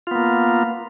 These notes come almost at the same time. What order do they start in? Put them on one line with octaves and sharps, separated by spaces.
F4 B3 A#3